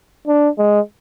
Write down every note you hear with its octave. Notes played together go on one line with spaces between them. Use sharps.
D4
G#3